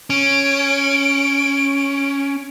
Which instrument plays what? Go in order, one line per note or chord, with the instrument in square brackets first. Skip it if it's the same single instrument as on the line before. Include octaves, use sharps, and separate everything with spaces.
[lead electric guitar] C#4 [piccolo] D7